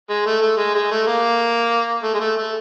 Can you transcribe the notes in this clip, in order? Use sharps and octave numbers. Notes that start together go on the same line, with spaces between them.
G#3
A3
A3
G#3
G#3
A3
A#3
A3
G#3
A3
A3